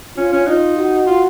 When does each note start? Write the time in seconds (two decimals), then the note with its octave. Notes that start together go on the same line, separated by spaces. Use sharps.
0.17 C#4 F4
0.32 C#4
0.47 D#4 F4
0.77 F#4
1.07 F4